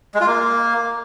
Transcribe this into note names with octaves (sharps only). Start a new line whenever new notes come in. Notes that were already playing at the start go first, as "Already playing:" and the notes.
G#3
F4
A#3